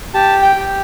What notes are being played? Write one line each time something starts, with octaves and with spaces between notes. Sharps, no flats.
G4 A5
G5
G4